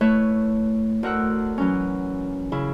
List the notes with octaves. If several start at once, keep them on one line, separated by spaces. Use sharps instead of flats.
A3 E4 B4 C#5 E5
D2 A#4 F#5 E6
E3 F#3 C#4
C#3 E4